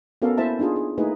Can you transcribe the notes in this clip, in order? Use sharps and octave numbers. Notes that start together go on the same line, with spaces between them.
B3 C#4 F#4 A4 A#4 F5
A#3 E4 C5 E5 A5
D4 D#4 F4 G#4 A5
G#4
A3 A#3 D#4 E4 G#4 B4